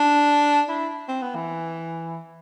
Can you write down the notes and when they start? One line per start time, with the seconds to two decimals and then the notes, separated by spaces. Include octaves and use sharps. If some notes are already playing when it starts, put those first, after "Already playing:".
Already playing: D4
0.69 E4
1.08 C4
1.22 B3
1.35 E3